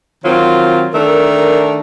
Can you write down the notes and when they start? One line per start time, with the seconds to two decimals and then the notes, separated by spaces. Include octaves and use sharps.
0.24 D#3 F#3 C4 F4
0.94 D#3 A3 D4 A#4